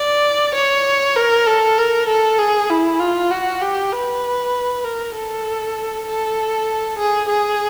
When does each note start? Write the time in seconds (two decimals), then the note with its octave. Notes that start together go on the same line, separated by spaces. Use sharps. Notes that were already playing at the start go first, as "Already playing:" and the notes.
Already playing: D5
0.54 C#5
1.16 A#4
1.47 A4
1.78 A#4
2.07 A4
2.39 G#4
2.70 E4
2.99 F4
3.31 F#4
3.61 G4
3.92 B4
4.84 A#4
5.14 A4
6.06 A4
6.98 G#4
7.29 G#4